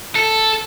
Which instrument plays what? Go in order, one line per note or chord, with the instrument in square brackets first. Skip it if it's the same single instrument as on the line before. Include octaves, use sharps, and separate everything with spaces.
[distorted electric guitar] A4